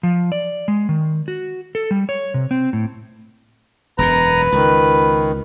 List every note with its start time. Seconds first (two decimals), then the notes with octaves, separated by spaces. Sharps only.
0.03 F3
0.32 D5
0.68 G#3
0.89 D#3
1.28 F#4
1.75 A4
1.91 G3
2.09 C#5
2.34 C3
2.51 C4
2.73 A2
3.99 E1 F#2 B2 B4 A#5
4.52 C#2 D#3